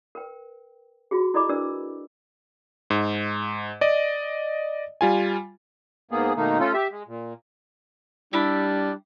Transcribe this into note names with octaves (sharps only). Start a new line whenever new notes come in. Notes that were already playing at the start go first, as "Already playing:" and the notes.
A#4 B4 G5
F4 F#4 G#4
E4 A4 D5 D#5 B5 D6
D4 A#4 B4 D5 E6
G#2
D5 D#5
G3 F4 G#5
G#2 A#3 B3 G#4
B2 D#3 A3 A#3 D#4
A3 C#4 F4 A4
G4 E5
G#3
A#2
G3 D4 E4 G4 B5